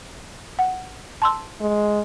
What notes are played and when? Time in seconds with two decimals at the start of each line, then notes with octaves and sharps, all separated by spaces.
0.59 F#5
1.22 A5 C6 E6
1.61 G#3